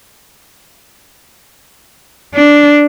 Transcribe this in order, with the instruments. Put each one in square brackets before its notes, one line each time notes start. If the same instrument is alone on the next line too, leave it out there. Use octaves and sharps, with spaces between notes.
[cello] D4